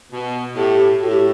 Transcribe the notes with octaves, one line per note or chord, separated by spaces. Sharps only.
B2
A2 G4
A2 F#4
G4